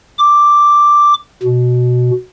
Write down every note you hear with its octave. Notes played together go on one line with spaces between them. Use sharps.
D6
B2